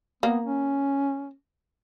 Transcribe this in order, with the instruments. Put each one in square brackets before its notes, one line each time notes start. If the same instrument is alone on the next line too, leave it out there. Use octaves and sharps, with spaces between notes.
[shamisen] A#3 [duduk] B3
[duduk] C#4